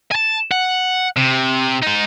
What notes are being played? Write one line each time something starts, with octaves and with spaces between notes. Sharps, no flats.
G#5 A5
F#5
C3
G#3 D#4